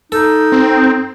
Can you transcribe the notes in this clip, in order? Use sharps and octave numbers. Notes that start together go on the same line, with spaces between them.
D#4 A4
C4